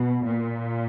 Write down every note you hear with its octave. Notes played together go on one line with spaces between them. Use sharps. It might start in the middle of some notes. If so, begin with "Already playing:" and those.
Already playing: B2
A#2